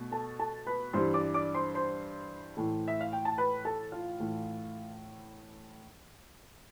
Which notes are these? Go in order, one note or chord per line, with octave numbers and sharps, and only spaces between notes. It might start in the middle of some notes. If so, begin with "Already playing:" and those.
Already playing: B2 A3
A4 A5
A4 A5
B4 B5
G2 E3 G3 C5 C6
D5 D6
D5 D6
C5 C6
C5 C6
A2 E3 A3
E5
F5
G5
A5
B4 B5
A4 A5
F4 F5
A2 E3 A3